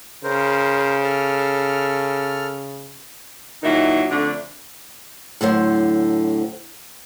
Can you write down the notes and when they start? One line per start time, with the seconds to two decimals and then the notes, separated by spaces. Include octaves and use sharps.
0.24 C#3 A#4 C5
1.04 A4 F6
3.63 A#2 D#3 F#3 D#4 E4
4.10 F2 D3 A3 D4
5.41 A2 D3 F#3 C5